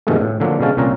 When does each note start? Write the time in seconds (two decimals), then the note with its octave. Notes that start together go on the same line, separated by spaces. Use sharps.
0.07 G2 B2 D#3 F3 G#3 A3
0.21 A2
0.40 D3 F3 F#3 A#3
0.60 B2 D3 G#3 C#4 F5 A5
0.77 C2 A#2 C#4 F4 A#5